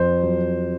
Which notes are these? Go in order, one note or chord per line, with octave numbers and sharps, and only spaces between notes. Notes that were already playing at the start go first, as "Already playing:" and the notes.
Already playing: F2 C5
F#3